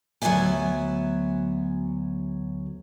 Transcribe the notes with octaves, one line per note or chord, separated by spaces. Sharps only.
D2 F#3 G#3 B3 E5 G#5